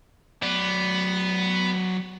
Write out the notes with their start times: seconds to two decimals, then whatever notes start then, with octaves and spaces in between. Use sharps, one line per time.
0.43 F#3 B3 D5